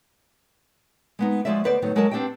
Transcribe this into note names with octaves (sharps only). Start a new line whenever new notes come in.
G#3 B3 D#4
F3 F#3 G#3 F#4 D5 E5
D2 B3 B4 C5 D5
A2 D#3 F#3 B3
F#3 G#3 F#4 A#4 D#5 A5
B3 C4 D4 G4 D#5 G5